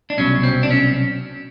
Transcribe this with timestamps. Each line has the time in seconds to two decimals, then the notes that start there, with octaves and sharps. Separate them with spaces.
0.10 D4
0.17 C2 B2 F#3 C#4
0.43 C4
0.63 D4
0.71 C#4